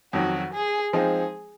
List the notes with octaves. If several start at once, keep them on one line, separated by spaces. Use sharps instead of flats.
F2 D#3 F#3 F#4
G#4
F3 G#3 C4 D#4 G#4